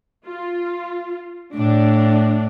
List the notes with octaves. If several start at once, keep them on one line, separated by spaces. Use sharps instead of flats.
F4
A2 D4